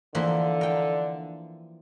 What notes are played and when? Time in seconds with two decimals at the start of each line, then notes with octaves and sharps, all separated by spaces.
0.15 D3 E3 F3 A#3
0.61 A#4 G5